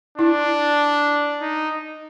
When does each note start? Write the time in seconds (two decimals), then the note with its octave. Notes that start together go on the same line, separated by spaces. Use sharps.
0.18 D4 E4
1.41 D#4